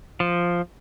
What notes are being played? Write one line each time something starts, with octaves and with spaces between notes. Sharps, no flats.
F3